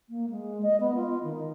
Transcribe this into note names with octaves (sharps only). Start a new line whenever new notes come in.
A#3
G#3
D#5
B3
F4
D#3